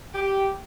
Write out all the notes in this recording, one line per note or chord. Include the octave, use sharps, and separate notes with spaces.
G4